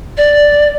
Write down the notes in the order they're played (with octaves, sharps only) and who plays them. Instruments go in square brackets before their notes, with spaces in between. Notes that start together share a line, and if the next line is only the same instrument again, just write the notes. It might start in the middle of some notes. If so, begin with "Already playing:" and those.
[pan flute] D5